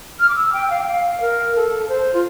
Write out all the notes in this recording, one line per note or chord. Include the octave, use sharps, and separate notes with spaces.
F6
D6
E6
G5
F5
G5
F5
A#4
A4
C5
F4